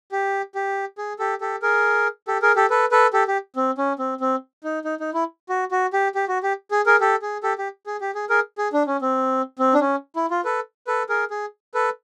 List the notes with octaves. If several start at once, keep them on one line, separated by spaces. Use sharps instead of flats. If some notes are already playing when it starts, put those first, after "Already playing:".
G4
G4
G#4
G4 A4
G4 A4
G#4 A#4
G4 A4
G#4 A#4
G4 A4
A4 B4
A4 B4
G4 A4
G4
C4
C#4
C4
C4
D#4
D#4
D#4
E4
F#4
F#4
G4
G4
F#4
G4
G#4
G#4 A#4
G4 A4
G#4
G4 A4
G4
G#4
G4
G#4
G#4 A#4
G#4
D4
C#4
C4
C4
D4
C#4
E4
F4
A4 B4
A4 B4
G#4 A#4
G#4
A4 B4